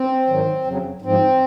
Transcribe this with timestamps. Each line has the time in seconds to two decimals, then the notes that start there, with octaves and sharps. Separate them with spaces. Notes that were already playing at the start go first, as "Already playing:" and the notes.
Already playing: C4
0.27 G#2 D#3 F#3
0.65 F2 C#3 F#3
1.02 G#2 F3 C4